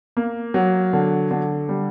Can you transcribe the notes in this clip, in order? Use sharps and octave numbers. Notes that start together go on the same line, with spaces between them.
A#3
F#3
D3
D3
G3